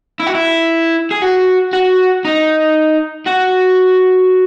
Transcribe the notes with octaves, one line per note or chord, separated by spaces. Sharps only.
E4
F#4
E4
G#4
F#4
F#4
D#4
F#4